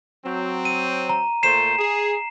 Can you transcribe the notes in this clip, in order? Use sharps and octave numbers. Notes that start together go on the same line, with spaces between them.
F#3 C4
D#7
A#5
A#2 A3 C5 C7 E7
G#4